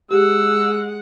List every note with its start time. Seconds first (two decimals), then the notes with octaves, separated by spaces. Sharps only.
0.11 G#3 G4 F#5 E6